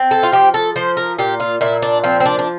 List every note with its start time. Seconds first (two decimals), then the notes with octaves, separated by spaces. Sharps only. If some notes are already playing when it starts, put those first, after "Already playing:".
Already playing: C4
0.11 A4
0.23 F4
0.32 F3 G4
0.54 A4
0.76 F3 C5
0.97 A#4
1.18 A#2 G4
1.40 F4
1.61 A#2 E4
1.82 D4
2.04 F3 C4
2.20 C4
2.26 D4
2.39 D4